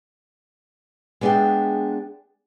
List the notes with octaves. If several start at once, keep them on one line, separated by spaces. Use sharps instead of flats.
G#3 B3 D4 G#4 E5 G5